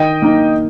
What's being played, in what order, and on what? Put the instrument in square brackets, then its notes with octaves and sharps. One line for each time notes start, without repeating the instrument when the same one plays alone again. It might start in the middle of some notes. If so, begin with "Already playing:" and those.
Already playing: [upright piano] D#3 [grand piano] D#5 G5
[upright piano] A#3 D#4